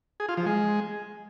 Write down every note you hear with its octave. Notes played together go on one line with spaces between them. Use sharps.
G#4
F4
F3
G#3